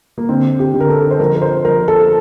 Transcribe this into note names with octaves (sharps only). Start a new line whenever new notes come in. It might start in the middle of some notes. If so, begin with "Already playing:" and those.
A#3
D3 C4
G4
D3
A#4
A4
C5
F3 A#4
A#4
C5
F3 A#4
A4